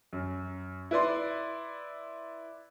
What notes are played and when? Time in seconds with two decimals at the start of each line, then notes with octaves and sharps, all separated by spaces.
0.13 F#2
0.91 E4 B4 D5 C6